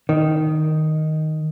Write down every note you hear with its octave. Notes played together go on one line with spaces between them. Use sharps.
D#3